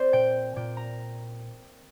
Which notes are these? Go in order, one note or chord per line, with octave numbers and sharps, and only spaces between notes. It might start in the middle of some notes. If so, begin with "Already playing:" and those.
Already playing: C4 C5 D5
A#2 G5
A#2 G5
A#5